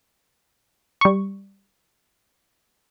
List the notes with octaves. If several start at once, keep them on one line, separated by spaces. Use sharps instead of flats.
G3 C#6